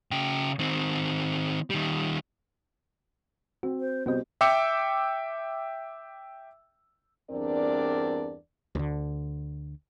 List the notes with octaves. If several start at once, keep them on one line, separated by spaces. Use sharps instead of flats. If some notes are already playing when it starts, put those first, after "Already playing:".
C#3 G5
D#3 C4
D#3 G3
C4 F#4
C5
C2 B3 F#4 C5 D#5
E5 G5 D6 E6 C#7
E2 G2 C4 D4 A#4 D5
D2 D3